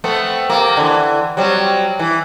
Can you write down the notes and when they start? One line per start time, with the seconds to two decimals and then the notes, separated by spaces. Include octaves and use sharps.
0.04 A3 B3 C4
0.50 C3 A#3
0.77 D3 E3
1.37 F#3 G3 C4
1.99 E3